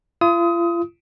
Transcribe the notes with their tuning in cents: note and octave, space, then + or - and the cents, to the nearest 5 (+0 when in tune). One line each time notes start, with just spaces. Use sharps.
F4 -40 D#6 +25